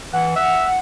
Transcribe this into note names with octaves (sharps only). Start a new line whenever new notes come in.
E3 F#5
E5 F#5